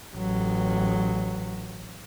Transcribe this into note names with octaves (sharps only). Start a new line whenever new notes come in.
A1 F#3